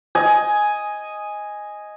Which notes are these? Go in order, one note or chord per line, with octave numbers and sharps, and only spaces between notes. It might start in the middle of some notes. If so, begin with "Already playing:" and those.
D#5 G#5